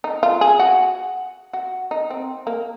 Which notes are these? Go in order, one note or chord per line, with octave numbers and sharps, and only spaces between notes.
D#4
F4
G#4
F#4
F#4
D#4
C4
A#3